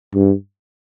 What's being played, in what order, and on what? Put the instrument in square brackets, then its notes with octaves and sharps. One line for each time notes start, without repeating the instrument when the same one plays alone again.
[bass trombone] G2